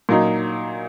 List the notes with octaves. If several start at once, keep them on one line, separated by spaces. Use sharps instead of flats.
A#2 F#3 D#4